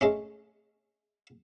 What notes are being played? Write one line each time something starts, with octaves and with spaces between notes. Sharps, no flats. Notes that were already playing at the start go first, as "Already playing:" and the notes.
G#3 A3 C#4